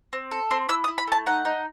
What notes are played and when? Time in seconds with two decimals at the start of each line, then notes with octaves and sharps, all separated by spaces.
0.13 C4
0.31 A4
0.51 C4 C6
0.69 E4 E6
0.84 D#6
0.88 E4
0.98 B5
1.07 A3 A5
1.26 D#4 F#5
1.45 D#4